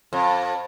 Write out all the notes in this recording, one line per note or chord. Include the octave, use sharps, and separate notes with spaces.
F2